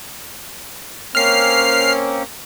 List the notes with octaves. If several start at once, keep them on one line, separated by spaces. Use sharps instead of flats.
A#3 C4 C#4 F6 C7